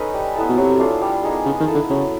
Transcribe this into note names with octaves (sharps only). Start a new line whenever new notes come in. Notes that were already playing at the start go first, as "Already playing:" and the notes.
Already playing: C#4 D#4 A4 B4 D#5
G3
B3 E4 A4
B2
C3 F#3
A3 D4 F4
G3
B3 D#4 G#4
C#3 B3
D#3
E4 A4
D3
C#3 F#3